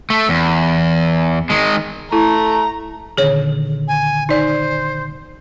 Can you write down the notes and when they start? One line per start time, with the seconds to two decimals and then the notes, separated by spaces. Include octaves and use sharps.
0.10 A3
0.29 E2
1.50 D#3 G#3
2.12 A3 E4 A#5
3.17 A#2 D3 D#3 G#4 C#5
3.88 G#5
4.29 D#4 C5 D5